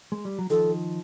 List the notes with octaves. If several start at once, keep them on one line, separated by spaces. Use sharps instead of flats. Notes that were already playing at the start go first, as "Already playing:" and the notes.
G#3
G3
F#3
D#3 F3 A4